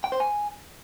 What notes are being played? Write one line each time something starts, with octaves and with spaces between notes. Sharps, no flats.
G5
C5
G#5